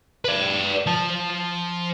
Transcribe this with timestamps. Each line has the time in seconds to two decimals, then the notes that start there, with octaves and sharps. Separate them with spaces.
0.25 B4 D5
0.86 F3 A5